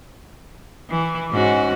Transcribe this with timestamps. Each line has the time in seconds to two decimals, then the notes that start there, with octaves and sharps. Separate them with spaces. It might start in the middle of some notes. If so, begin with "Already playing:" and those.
0.90 E3
1.31 G#2 C#4 F#4